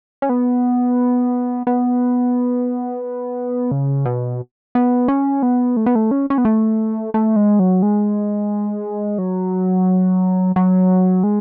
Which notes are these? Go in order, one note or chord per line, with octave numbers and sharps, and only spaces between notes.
C#4
B3
B3
C#3
B2
B3
C#4
B3
A3
B3
A3
C#4
C#4
B3
A3
A3
G#3
F#3
G#3
F#3
F#3
G#3